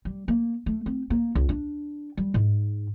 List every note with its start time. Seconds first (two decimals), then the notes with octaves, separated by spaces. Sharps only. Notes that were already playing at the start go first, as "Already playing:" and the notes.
0.05 G3
0.28 A#3
0.66 A3
0.86 C4
1.10 A#3
1.35 C#2
1.49 D4
2.17 G3
2.34 G#2